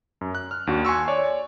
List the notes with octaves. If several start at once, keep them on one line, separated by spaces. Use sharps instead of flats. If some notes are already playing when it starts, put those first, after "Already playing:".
F#2
F#6
F6
D#2 D4 F#4
G#5 C6 C#6 E6
C#5 D5